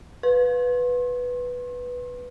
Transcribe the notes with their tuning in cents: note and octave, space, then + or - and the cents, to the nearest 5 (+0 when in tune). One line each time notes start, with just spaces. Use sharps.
B4 +0 C6 +40